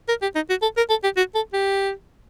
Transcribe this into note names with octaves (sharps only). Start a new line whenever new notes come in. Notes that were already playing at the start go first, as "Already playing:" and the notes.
A#4
G4
D#4
F#4
A4
A#4
A4
G4
F#4
A4
G4